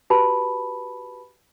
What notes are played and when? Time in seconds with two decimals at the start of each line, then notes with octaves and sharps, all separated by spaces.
0.10 F#4 G4 B4 A5 B5